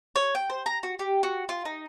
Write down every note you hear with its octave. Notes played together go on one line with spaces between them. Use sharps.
C#5
G5
C5
A#5
F#4
G4
F#4
F4
D#4